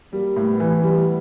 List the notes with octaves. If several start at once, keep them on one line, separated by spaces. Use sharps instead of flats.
G3 A#3
A2
B3
E3
G3 B3